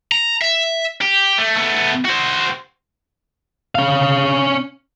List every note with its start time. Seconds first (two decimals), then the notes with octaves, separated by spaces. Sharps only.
0.12 A#5
0.41 E5
1.01 G4
1.38 A3
1.56 A3 B3
2.05 F#4 C5
3.75 C#4 F5